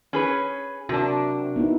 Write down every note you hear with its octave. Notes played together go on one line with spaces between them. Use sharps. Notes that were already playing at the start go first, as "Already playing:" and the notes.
C#4 G#4 B4
C3 D4 F#4 A#4
B3 D#4 E4